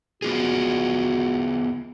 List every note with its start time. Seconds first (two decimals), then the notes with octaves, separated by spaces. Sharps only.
0.22 B3 F4 F#4 G#4